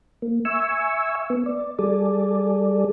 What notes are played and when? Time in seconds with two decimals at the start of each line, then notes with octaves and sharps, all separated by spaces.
0.22 A#3
0.45 E5 G#5 C#6 E6
1.30 B3
1.46 D5
1.79 G3 G#4 A4 D5